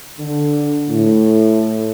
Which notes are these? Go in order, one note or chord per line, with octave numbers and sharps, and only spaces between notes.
D3
A2